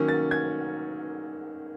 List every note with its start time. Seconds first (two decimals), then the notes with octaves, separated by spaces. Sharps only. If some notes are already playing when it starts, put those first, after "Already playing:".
Already playing: D#3 F#3 A#3 C#4
0.08 A6
0.31 G#6